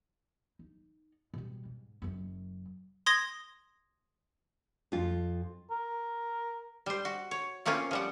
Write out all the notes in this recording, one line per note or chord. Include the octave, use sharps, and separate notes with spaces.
D#4
B2 G3
G#2
F#1 F#2
C6 D#6 G#6 A#6
F2 F4
A#4
G3 C5
F#4
C#5
A3 A#3 C4 C#4 F4
F3 G3 F#5